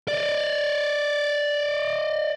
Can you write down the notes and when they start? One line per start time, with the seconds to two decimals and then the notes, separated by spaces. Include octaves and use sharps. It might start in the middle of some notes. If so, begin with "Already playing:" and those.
0.08 D5 D#5